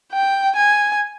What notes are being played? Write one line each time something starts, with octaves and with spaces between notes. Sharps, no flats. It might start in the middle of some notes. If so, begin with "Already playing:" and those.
G5
G#5